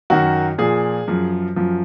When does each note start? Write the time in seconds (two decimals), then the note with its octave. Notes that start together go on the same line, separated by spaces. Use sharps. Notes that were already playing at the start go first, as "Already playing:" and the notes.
0.10 F#2 D#3 F#3 F#4
0.58 A#2 F3 G#4
1.08 F#2 F3
1.56 F#2 F3